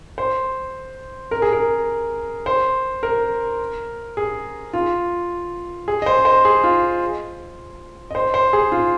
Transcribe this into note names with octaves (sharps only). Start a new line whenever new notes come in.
C5
A#4
G#4
A#4
C5
A#4
G#4
F4
G#4
D#5
C5
C5
G#4
F4
D#5
C5
C5
G#4
F4